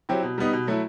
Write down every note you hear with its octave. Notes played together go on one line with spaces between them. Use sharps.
F#3 C4 E4 G4
B2
G3 B3 D#4
B2
F#3 A3 E4